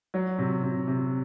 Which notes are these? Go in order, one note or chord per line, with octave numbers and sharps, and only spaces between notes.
F#3
C3
C3
C3